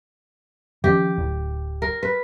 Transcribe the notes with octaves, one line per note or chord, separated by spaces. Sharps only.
D#3 F3 C#4 G4
D1
A#4
B4